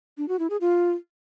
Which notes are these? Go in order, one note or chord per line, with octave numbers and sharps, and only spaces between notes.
D4
F#4
E4
G#4
F4